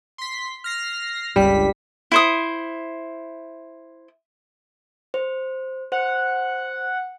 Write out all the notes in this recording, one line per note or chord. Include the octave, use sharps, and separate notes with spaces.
C6 B6
F6 A#6 C7
G1 C#2 G3 B6
E4 C5 D#6
C5
C5 F#5